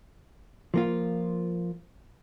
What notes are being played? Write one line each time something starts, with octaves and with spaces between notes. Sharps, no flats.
F3 A#3 F4